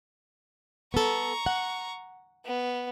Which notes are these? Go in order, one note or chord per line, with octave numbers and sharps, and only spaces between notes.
B3 A4 A#5 C#6
F#5
B3